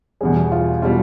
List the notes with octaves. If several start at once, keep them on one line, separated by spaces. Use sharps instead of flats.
E2 B2 G3 G#4
F4
B2 G3 F4